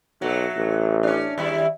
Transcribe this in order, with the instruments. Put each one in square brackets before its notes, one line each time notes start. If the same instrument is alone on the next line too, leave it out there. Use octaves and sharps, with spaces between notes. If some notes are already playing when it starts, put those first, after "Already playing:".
[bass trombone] B1 [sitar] F#3 A3
[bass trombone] A1
[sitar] C#4 D4
D#2 G3 E4